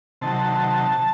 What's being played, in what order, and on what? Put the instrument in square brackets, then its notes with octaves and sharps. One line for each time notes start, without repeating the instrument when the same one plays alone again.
[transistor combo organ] C3 D#3 F#3 A5